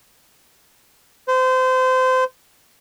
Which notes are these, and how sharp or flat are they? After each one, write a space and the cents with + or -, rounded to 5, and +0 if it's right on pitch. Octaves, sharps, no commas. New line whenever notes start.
C5 -25